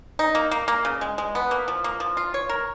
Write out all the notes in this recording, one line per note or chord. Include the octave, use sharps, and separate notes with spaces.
D#4
A#3
A#3
A#3
C#3
G#3
G#3
B3
A#3
F3
A#3
F3
F4
C#5
A#4